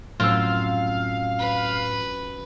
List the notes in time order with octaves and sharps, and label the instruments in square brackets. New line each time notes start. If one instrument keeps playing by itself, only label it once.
[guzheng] F#2 C4 F4 [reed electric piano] A2 E6 [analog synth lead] F5
[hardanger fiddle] B4